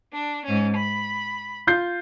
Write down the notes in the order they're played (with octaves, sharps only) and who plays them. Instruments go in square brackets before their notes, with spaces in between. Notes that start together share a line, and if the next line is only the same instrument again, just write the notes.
[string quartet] D4
G#2 C#4
B5
[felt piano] F4 G6 C7